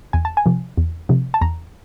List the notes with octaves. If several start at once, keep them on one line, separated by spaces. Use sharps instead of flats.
E2 G#5
A5
G#5
C3 F3
E2
C3 F3
A5
E2 A#5